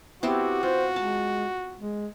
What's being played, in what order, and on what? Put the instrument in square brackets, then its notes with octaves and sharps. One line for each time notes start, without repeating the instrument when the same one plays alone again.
[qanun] B3 C4 E4 [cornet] F#4 [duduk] G4
[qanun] F4 [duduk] C5
[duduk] G#3 [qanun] A5
[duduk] G#3